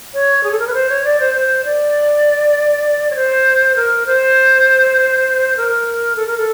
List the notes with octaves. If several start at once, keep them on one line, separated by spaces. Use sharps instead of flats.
C#5
G#4
A4
A#4
B4
C5
C#5
D5
C5
C5
D5
C#5
C5
A#4
C5
A#4
A4
A#4
A4